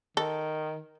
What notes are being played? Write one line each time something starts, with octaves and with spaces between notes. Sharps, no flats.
D#3 A4